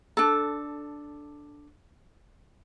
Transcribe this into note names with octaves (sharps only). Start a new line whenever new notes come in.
D4 A4